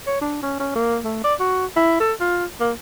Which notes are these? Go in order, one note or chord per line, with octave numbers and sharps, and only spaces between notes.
C#5
D4
C#4
C#4
A#3
A3
D5
F#4
E4
A4
F4
A#3